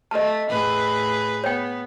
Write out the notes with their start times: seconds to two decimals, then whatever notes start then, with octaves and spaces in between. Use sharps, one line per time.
0.11 A3 D#5 A5
0.49 A2 G#4 B4
1.44 B3 C#5 G5